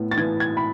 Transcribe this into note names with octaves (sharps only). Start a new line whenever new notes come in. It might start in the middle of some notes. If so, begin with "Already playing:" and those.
Already playing: A2 B3
A6
E3 G#6
G#6
B5